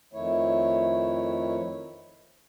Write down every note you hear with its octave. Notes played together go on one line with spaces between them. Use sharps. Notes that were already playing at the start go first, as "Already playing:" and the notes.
F2 D#3 A3 E4 C#5